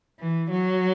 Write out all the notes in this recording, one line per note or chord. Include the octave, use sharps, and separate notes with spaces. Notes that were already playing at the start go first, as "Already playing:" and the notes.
E3
F#3